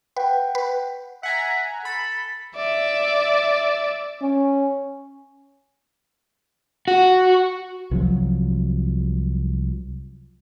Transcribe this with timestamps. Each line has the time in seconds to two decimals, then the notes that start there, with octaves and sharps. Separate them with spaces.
0.17 B4 F#5 G5
0.55 B4
1.23 E5 F#5 G#5 A#5
1.85 A4 B5
2.56 D5 E5
4.22 C#4
6.88 F#4
7.91 C2 F3 F#3